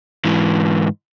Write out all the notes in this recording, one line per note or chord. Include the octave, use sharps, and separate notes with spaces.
G#2 E3